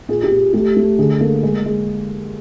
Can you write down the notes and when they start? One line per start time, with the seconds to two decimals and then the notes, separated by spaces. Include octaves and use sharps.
0.09 A#2 G#4
0.23 G4
0.31 A#2
0.53 A3 G4
0.77 A3
0.99 D3 G#4
1.21 A#3 A4
1.43 G#3 G#4
1.66 G#3